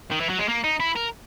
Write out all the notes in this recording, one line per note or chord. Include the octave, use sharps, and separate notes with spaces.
D#3
E3
F#3
G#3
A#3
D#4
E4
A#4